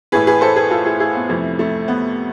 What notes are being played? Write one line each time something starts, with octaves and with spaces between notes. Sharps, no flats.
A2 E3 G#4 B4
G#4 B4
A4 C5
G#4 B4
F4 A4
E4 G#4
E4 G#4
B3
F2 C3 E3 A3
A3
B3